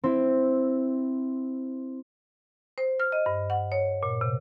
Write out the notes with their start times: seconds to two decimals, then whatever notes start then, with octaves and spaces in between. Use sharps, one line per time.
0.04 C4 E4
2.78 C5
3.00 F6
3.12 D#5
3.26 G2
3.50 F#5
3.72 C#5
4.03 A#2
4.21 C3